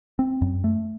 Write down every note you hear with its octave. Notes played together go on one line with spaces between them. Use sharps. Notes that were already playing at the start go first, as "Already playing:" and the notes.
C4
F#2
A3